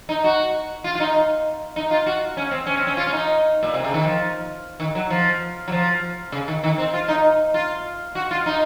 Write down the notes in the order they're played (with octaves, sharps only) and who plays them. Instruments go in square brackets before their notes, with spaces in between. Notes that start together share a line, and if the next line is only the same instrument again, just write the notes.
[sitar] D#4
F#4
F4
F4
D#4
D#4
F4
F#4
C#4
C4
C#4
C4
C#4
F4
C#4
D#4
A#2
C3
C#3
D#3
F3
D#3
F#3
F3
F#3
F3
C#3
D#3
D#3
C4
F4
D#4
F4
F#4
F4
D#4